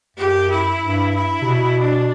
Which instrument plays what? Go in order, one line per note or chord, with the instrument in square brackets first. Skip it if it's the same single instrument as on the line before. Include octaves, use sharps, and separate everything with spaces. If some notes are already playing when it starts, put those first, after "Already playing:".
[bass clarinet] F#2 [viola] G4
[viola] E4
[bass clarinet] G2
[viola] E4
[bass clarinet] C3
B2
[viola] D4